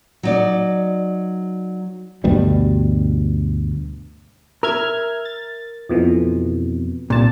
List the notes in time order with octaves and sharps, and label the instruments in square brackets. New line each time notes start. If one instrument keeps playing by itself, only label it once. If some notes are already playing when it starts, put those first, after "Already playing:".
[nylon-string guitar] F#3 D#4 D5
[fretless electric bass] D2 G2 B2 G3
[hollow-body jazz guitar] A#4 [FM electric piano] E5 F6 G#6
[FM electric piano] A6
F2 B2 E3
[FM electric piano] C2 A5 [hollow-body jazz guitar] A#2